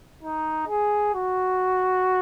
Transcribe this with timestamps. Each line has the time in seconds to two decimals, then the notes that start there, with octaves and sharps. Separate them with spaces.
0.23 D#4
0.68 G#4
1.15 F#4